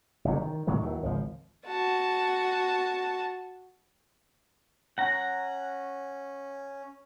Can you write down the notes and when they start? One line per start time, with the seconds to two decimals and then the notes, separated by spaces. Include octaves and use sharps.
0.25 F#1 C3 F#3
0.42 D#3
0.67 A2 D#3 F#3 G#3
0.82 D#2 D#3 E3 F#3
1.03 G#1 C#2 F3
1.66 F#4 A5
4.98 C#4 F#5 A#5